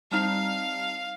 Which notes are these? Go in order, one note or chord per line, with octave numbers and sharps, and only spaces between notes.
G3 C4 D#4 F5 A5 F6 F7